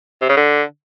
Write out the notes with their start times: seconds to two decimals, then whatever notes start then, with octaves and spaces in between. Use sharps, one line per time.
0.22 C3
0.29 C#3
0.37 D3